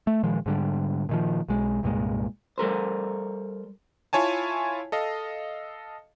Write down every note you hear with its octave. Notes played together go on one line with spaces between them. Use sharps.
A3
A#2 D#3 F3 G#3
G#2 D3 G3
A#2 D#3 F3
B1 G#3
C2 G2 A#2 G#3
G3 A4 A#4 C5
E4 F4 C#5 G#5 A5
A4 D#5 F5